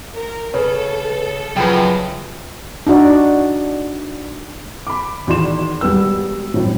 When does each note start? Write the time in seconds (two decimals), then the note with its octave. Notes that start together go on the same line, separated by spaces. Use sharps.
0.14 A#4
0.54 C#3 A4 B4 C#5
1.57 F#2 C#3 F3 B4 G5
2.87 D4 D#4 F#4 D5
4.87 B5 D6
5.27 E2 D#3 F#4 D5 C6 E7
5.81 E1 G3 B3 E6
6.54 G#1 F#2 A2